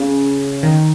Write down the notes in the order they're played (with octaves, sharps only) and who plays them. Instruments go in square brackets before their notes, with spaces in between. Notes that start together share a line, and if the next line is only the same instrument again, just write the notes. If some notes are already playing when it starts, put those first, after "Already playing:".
Already playing: [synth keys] C#3
D#3